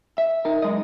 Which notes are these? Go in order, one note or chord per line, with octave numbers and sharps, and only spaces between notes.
E5
D#4 A#4
F#2 G#3 D#5